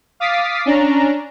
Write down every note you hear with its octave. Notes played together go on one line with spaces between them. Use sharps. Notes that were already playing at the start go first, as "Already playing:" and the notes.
F5 D6 D#6 A6 B6 C7
C#4 D4 A#5